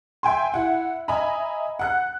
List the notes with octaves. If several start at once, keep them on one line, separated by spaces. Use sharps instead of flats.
E5 G5 G#5 C6
E4 F#5
D#5 E5 G#5 A#5 B5
F#5 F#6